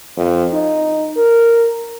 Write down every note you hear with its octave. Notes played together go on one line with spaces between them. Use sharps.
F2
D#4
A#4